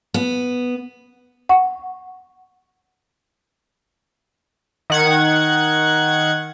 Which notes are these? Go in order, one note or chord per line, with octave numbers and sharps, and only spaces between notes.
B3
F#5 C#6
D#3 F#5 G#6